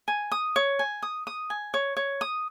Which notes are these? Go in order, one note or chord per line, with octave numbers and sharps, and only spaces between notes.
G#5
D#6
C#5
G#5
D#6
D#6
G#5
C#5
C#5
D#6